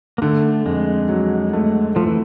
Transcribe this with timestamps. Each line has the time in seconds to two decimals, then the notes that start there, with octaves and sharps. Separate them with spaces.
0.18 A#3
0.22 D3 A3
0.66 F2 G#3
1.09 F#3
1.53 A3
1.96 F3 A3
2.07 E3